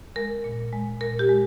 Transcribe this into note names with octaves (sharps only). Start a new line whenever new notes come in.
G#3 A#4
A#2
G#3
A#2 A#4
G4
G#3